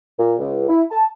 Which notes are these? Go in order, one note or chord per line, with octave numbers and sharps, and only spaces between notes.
A#2
C#2
E4
A5